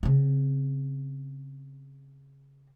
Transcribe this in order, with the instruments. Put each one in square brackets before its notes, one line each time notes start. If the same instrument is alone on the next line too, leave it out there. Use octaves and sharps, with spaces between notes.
[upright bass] C#3 C4